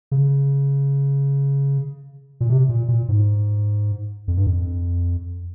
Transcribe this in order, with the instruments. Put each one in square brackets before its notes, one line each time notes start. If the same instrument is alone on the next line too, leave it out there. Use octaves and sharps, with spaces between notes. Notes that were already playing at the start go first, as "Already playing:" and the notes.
[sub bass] C#3
A#2
C3
A#2
A#2
G#2
F2
G2
F2